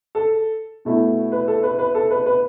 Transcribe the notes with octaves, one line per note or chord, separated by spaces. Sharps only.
A4
B2 A3 E4
B4
A4
B4
B4
A4
B4
B4